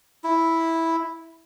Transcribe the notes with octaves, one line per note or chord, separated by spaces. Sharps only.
E4